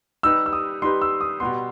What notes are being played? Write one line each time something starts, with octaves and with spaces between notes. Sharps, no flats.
G3 D#4 G4 B4 E6
E6
D#6
G3 D#4 G4 B4 C6
E6
D#6
B2 G3 B3 C6